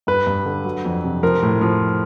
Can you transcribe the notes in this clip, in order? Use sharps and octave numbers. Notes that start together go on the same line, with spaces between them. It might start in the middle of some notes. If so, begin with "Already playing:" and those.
G2 B4
G2
D3
F#3
F2
C3
F3 A#4
A2
F3